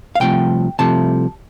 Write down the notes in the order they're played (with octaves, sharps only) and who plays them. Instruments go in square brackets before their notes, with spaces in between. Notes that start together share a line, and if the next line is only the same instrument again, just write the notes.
[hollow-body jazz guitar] F5
C2 C3 F3 A3 G5
C2 C3 F3 A3 A5